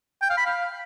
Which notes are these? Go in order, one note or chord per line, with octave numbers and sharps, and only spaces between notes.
G5
F5
B5
F5